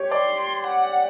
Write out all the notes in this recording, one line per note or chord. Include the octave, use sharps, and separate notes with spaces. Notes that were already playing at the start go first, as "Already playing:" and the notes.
Already playing: G4 C#5
D5 C6
F#5